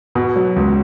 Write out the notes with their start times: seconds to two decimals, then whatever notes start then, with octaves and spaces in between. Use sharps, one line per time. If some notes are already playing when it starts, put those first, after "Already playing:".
0.15 B2
0.36 F#3
0.56 C#2